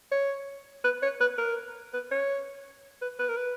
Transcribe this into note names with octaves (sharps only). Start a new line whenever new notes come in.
C#5
B4
C#5
B4
A#4
B4
C#5
B4
B4
A#4
B4